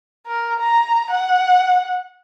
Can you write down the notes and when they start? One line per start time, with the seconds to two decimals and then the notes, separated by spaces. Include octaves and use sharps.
0.26 A#4
0.60 A#5
1.11 F#5